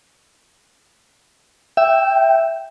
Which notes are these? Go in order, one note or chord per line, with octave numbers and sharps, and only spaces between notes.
E5 G5